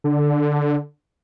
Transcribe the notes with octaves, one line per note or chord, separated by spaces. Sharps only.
D3